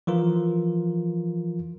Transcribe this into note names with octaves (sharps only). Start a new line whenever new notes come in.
E3 F3 F4 A#4